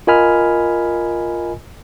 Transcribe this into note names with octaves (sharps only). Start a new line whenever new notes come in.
F4 A#4 D#5 G#5 B5 F6